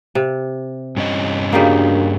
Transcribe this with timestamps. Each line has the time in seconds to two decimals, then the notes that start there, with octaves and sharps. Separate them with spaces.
0.15 C3
0.97 G2 C#4 D#5
1.53 C#3 G3 A#3 D4 F#4 A#4